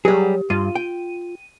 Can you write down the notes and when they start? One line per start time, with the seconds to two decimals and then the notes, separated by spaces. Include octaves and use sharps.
0.05 F#3 G3 G4 G#4
0.50 G2 F4 D#7
0.75 G5